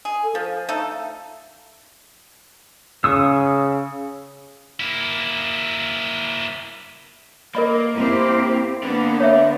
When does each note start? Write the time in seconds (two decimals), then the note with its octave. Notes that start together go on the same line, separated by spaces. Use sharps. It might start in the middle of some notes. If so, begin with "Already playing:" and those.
0.05 G#4
0.23 A4
0.35 F3 F5
0.69 A3 D#4 A4
3.04 C#3 C#6 D#6 E6
4.80 A#3 E4
7.55 A#3 A#4 D#5 B5
7.96 C4 E4 G4
8.83 D3 A#3 B3
9.20 C#5 E5